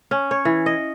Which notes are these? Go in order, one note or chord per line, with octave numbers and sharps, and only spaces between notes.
C#4
C#5
E3
D#5